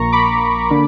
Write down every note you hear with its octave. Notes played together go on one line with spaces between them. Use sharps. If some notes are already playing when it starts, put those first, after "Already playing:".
Already playing: A#1 A#2 A#3 A#5 C#6
B5 D6
D3 A#3 D4